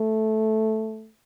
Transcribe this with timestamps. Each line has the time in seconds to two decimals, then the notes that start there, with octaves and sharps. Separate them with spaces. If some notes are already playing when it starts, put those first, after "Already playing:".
Already playing: A3